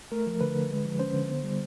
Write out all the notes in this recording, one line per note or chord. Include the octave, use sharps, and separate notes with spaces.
A3 A#4
F3
D3 B4
D3
G#3
F3
C#4 C5
D3
B3
G3